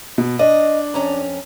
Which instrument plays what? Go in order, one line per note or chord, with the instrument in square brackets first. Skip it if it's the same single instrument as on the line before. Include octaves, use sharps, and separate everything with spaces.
[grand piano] B2
[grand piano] D4 [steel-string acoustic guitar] D#5
[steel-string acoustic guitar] F2 C#4 A#5